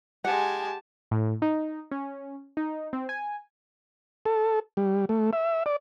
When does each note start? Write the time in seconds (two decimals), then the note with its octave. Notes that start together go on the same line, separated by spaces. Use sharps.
0.25 G#3 G4 F#5 G#5 A5
1.11 A2
1.42 D#4
1.91 C#4
2.57 D#4
2.93 C4
3.09 G#5
4.26 A4
4.77 G3
5.09 A3
5.33 E5
5.66 D5